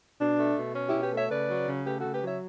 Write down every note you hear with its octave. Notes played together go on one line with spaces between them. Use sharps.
B2 D4
A3
B2
C#4
B2 E4 G4
G4 B4
A3 C#5 E5
C#3 B4 D5
F#3
C#3
A3 G4 B4
C#3 F#4 A4
G4 B4
F#3 C#5 E5